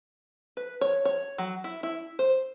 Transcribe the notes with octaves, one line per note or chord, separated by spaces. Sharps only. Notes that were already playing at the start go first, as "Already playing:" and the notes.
B4
C#5
C#5
F#3
E4
E4
C5